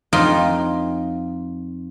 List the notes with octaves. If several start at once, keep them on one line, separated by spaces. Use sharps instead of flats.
F2 D#4 F4 D#5